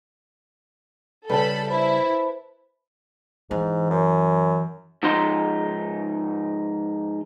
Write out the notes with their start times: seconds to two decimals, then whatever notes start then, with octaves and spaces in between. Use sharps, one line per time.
1.29 C#3 G3 A4 B4 A5 B5
1.69 E4 C5 E5 B5
3.51 G#2 E3
3.90 F#2
5.03 G#2 F3 D#4 C6